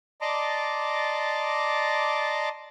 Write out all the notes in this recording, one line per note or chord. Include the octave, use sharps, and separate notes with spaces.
D5 D#5 A5 A#5 C6 D6